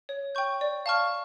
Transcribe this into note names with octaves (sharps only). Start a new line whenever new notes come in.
C#5
G5 C#6 G6
D5
F5 A5 C#6 F6